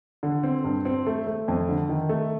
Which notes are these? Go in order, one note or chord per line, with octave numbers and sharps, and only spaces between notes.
D3
C4
G2
C4
A3
A3
F2
D3
D#3
A3